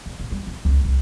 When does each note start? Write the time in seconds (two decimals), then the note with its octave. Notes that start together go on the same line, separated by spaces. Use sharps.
0.06 C#3
0.20 C3
0.31 G3
0.47 C#3
0.65 C#2
0.85 C2